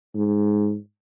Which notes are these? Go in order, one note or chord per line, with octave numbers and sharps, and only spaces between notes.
G#2